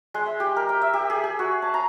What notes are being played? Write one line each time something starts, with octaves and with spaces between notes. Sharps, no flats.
G#3
E5
G4
A#4
G5
E5
G4
G#4
G#4
F#4
A5
A#5